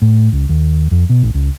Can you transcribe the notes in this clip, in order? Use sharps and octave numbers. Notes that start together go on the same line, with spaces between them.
A2
C#2
D#2
F2
B2
A1
C#2